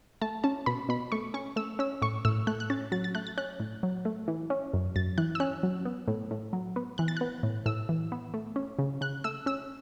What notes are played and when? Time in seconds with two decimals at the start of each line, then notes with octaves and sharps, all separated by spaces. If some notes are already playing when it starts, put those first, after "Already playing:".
0.22 A3 A5
0.44 C#4 A5
0.66 B2 B5
0.89 B2 B5
1.12 A3 C#6
1.34 C#4 C#6
1.56 A3 E6
1.79 C#4 E6
2.02 A2 C#6
2.25 A2 E6
2.47 A3 F#6
2.60 F#6
2.70 C#4 A6
2.92 F#3 A6
3.04 A6
3.15 A3 F#6
3.27 A6
3.38 C#4 F#6
3.60 A2
3.83 F#3
4.05 A3
4.28 E3
4.50 C#4
4.73 F#2
4.96 F#2 A6
5.18 E3 F#6
5.35 E6
5.40 C#4 F#6
5.63 F#3
5.85 B3
6.08 A2
6.31 A2
6.53 F#3
6.76 B3
6.98 E3 F#6
7.08 A6
7.17 B3 F#6
7.43 A2
7.66 A2 E6
7.89 E3
8.12 B3
8.34 A3
8.56 C#4
8.79 C#3
9.01 C#3 F#6
9.24 A3 E6
9.46 C#4 E6